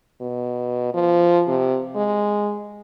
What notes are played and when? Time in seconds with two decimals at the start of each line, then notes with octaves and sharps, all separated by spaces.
0.21 B2
0.94 F3
1.47 C3
1.96 G#3